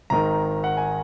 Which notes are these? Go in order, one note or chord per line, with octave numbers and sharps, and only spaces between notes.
G#1 G#2 D#3 A#5
F#5
G#5